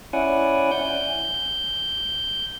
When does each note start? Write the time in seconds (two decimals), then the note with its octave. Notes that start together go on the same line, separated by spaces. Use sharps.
0.13 C#4 E4 D5 F#5 G#5
0.71 G6